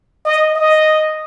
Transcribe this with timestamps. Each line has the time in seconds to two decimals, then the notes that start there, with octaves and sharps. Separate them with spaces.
0.25 D#5
0.55 D#5